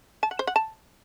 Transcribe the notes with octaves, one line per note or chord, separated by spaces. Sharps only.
A5
F#5
C5
F#5
A5